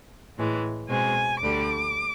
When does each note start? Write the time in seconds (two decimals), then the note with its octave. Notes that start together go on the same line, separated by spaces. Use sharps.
0.37 A2 E3 G#3
0.89 B2 G#3 C4 G#5
1.42 D2 D3 G3 D6